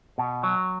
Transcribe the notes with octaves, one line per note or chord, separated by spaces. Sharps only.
B2
F#3